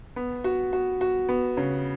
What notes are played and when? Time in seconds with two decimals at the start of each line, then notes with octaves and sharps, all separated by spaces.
0.16 B3
0.44 F#4
0.73 F#4
1.01 F#4
1.29 B3
1.57 C#3